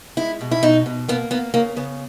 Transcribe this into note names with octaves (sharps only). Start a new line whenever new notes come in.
G#3 E4
B2
E4
B2 D#4
B2
A#3 B3
A#3 B3
C#3 A#3
C#3 B3